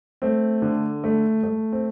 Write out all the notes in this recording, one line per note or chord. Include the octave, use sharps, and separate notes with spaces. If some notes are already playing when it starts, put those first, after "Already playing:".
A3 C4
D3
A3
A3
C4